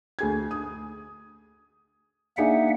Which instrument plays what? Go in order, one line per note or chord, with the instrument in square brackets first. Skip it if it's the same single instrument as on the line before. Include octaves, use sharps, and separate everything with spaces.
[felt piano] D2 G#4 G#6
D#6
[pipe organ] A#3 E5 F#5 [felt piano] D4 D#4 G#4